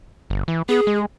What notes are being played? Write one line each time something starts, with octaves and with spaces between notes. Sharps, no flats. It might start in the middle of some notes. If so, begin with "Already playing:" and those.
G1
E3
B3 G#4
G#3